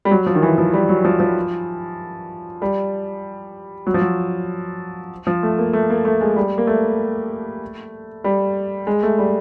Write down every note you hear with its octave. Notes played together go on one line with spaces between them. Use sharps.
G3
F#3
F3
D#3
E3
F3
G3
F#3
F3
F3
G3
F#3
F3
F#3
F3
A3
A#3
A3
A#3
A3
G#3
G3
A#3
A3
G3
G#3
A3
G3